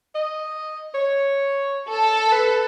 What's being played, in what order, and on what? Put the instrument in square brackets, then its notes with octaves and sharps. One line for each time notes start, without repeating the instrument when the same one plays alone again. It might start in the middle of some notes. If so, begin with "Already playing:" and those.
[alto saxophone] D#5
C#5
[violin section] A4
[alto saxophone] B4